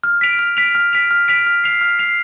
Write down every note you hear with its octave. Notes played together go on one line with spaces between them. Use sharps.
F6
B6 D7 F7
F6
B6 D7 F7
F6
B6 D7 F7
F6
B6 D7 F7
F6
C7 F7
F6
C7 F7